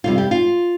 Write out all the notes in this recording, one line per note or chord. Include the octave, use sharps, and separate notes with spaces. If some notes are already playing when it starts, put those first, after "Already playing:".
F2 C3 G3 F4
G4
F4